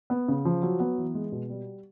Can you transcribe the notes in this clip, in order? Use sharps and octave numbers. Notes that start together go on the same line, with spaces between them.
B3
C#3
F3
F#3
B3
E3
G#3
B2
G3